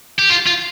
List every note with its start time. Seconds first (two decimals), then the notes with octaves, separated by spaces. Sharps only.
0.19 G4
0.30 F4
0.46 F4